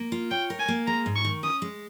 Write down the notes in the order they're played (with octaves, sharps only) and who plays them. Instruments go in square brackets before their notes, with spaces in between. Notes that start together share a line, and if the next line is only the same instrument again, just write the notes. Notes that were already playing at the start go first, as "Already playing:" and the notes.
Already playing: [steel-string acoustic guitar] A#3
F4
[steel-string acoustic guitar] C#5 [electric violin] G5
[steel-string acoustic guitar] A#4
[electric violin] G#5
[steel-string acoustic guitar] A#3
[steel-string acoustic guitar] G#3 [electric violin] A#5
[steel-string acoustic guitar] G#2
[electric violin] C#6
[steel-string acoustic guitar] D#3
[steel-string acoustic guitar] C#4 [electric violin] D#6
[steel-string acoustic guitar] G#3